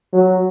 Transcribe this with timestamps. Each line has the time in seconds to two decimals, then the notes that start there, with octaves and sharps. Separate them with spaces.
0.13 F#3